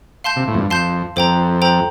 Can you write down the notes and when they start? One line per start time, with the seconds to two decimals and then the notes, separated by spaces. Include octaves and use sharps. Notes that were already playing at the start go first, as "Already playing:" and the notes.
0.24 F5 A5 C6 G6
0.36 C3
0.48 A2
0.54 F2
0.59 G2
0.70 F2 F5 A5 C6 G6
1.16 F2 A4 C5 G5 A#5
1.62 A4 C5 G5 A#5